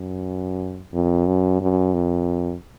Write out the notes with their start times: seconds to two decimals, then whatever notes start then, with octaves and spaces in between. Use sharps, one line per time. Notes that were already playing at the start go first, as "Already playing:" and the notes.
Already playing: F#2
0.93 F2
1.27 F#2
1.61 F#2
1.94 F2